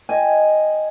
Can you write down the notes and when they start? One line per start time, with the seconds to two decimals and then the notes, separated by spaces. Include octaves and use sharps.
0.09 D#5 G5 G#5